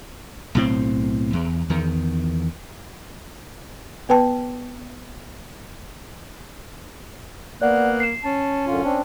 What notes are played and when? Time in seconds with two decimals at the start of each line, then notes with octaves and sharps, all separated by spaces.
0.55 B1 A2 C4
1.33 E2
1.70 E2 D#3
4.09 B3 B4 G5 A5
7.62 A#3 B3 D5 F#5 F#6
8.00 C7 E7
8.24 C#4 A5
8.67 F#2 D3 F4
8.84 C4 D4